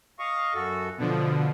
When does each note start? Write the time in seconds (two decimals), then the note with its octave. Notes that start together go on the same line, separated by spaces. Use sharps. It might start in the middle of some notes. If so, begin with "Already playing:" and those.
0.19 D#5 F5 C#6
0.54 F#2 F#4 A4
0.98 B2 D3 F3 B3